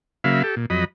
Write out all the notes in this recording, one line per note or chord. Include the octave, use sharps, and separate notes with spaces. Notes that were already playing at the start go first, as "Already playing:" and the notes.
C#3 F#3 A#3 E5 F5 B5
G4 A4
A#2
F2 F#3 D#5 B5